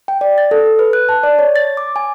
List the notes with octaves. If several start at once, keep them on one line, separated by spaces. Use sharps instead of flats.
G5
D5
A6
A4
B4
F#6
A5
D5
C#5
A6
D6
G#5